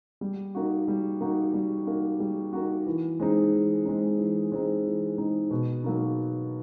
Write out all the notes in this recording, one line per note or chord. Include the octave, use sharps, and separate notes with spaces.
G3
A#3 D#4 F#4
G3
A#3 D#4 F#4
G3
A#3 D#4 F#4
G3
A#3 D#4 F#4
E3
G#3 C4 D#4
E3
G#3 C4 D#4
E3
G#3 C4 D#4
E3
G#3 C4 D#4
B2
F#3 A#3 D#4